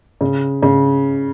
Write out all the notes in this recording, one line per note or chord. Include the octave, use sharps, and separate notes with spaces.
C#3
C#3